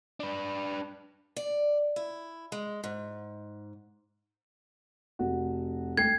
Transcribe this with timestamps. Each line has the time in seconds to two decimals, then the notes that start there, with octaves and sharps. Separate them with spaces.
0.20 D4 B4
1.36 D5
1.96 E4
2.52 G#3
2.84 G#2
5.19 F1 F#4
5.98 A3 G5 G#6 C7